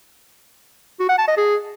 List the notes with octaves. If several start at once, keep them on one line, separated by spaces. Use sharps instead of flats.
F#4
F#5
A5
D#5
G#4